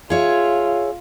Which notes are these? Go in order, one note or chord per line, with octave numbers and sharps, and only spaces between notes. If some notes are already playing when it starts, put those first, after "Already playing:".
F4 G#4 C#5 E5